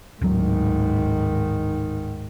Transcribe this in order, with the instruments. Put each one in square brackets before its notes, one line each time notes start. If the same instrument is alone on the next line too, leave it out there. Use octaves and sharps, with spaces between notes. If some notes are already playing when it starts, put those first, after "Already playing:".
[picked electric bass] D1 F#3 [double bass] G#2 D#3